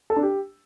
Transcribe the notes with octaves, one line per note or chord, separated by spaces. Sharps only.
A4
D4
G4